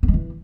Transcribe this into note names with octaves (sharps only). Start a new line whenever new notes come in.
B3
G#3
E3